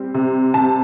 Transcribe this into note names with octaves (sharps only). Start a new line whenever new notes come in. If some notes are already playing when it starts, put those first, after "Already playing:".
Already playing: G3 C4
C3
C3 A5